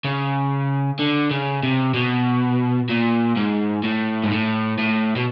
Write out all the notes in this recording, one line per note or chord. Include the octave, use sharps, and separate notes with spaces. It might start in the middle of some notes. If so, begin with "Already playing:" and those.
C#3
D3
C#3
C3
B2
A#2
G#2
A2
G#2
A2
A2
B2